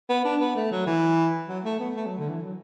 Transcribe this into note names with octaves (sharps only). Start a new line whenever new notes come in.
B3
D4
B3
A3
F#3
E3
F#3
A3
B3
A3
F#3
D3
E3
F#3